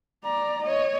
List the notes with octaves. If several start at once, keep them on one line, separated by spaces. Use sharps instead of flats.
D5 A#5
C#5 D#5